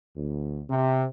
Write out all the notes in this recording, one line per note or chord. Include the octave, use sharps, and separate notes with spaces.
D2
C3